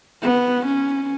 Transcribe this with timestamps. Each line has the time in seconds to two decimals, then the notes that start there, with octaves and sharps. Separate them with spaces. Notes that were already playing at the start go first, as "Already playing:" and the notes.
0.23 B3
0.66 C#4